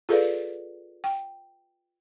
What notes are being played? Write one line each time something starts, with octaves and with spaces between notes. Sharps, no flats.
F4 G#4 A4 B4 D5 F5
G5